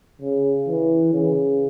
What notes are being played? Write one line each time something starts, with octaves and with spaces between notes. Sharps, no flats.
C#3
E3
C#3